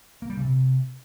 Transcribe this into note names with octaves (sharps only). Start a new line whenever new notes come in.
A#3
G3
C#3
C3